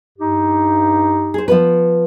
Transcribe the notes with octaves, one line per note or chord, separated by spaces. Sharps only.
G2 D#4 G4
G#4 C5
F3 B3 B4